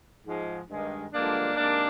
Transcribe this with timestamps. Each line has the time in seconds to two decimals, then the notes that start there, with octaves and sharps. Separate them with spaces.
0.25 G#2 F3 G#3
0.70 G2 D#3 G#3
1.13 G2 D3 F3 G#3 A#3 D4
1.57 C3 D#3 G#3 A#3 D4